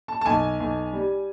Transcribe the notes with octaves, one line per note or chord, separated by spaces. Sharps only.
A5
A5
B1 G#5
B1
G3